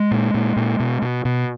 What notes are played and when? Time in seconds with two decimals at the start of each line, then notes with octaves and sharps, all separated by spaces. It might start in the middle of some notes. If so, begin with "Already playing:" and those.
Already playing: G#3
0.11 A#2
0.34 A#2
0.56 A#2
0.80 B2
1.02 B2
1.25 B2